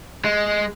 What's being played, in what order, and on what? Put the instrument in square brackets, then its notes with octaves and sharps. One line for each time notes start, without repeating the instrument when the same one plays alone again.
[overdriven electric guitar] G#3